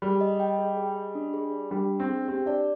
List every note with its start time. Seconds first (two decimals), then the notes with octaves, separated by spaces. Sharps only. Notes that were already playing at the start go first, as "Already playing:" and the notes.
0.02 G3 G#4
0.21 D#5
0.40 G5
0.58 G#4
0.77 G#4
0.96 D#5
1.15 D4
1.34 G#4
1.52 D5
1.71 G3 D4
1.90 D4
2.00 C4
2.09 G#4
2.28 C4 G4
2.46 D4 D5